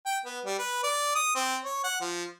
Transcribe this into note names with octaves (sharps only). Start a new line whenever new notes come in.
G5
B3
G3
B4
D5
D#6
C4
C#5
F#5
F3